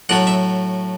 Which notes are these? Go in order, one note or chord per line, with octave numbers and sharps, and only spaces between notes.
A2 F#3 A3 F#5
E5